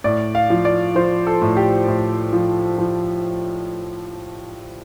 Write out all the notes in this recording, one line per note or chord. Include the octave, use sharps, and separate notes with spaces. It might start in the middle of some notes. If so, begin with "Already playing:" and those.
A2 D5
F5
F3
D5
F3 C5
A4
A2
G4
A2
F3
F3